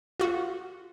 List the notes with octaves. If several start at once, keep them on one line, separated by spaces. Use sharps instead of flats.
F4 F#4